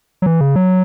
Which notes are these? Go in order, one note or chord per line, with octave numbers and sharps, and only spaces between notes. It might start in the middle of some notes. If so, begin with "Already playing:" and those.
F#3
E3
C#3
F#3